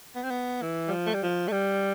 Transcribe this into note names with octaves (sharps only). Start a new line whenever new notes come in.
B3
C4
B3
E3
G3
F3
A3
G3
F3
A3
G3